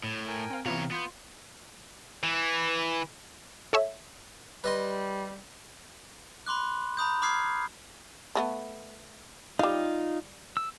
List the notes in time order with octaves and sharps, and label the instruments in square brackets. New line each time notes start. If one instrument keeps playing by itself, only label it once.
[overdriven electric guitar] A2
[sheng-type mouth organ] A#4 G5 G#5
[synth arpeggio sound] C4 F5
[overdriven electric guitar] C3 C#5 [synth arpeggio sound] E3 B3 F4 [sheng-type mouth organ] F5 A#5
[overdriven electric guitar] B3 [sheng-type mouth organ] F4 [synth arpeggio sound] G6 C7
[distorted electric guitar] E3
[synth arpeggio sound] A4 C#5 E5
[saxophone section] G3 [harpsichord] B4 D#5 C6
[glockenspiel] B5 C6 D6 F#6
A#5 B5 D#6 G6
B5 D6 D#6 F6 G#6 C7
[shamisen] F3 A3 B3
[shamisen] G3 F5 [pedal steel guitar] D#4 F4
[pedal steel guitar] E6